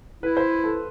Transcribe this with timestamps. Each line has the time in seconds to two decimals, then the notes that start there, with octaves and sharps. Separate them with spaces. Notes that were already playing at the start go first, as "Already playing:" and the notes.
0.23 E4 B4
0.37 C5
0.64 A4